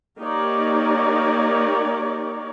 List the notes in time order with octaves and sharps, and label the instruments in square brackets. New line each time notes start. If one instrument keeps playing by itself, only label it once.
[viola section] A#3 D#4 G4 A#4 C#5 D5